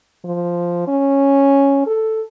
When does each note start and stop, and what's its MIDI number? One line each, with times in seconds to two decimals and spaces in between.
0.25 0.86 53
0.88 1.82 61
1.87 2.22 69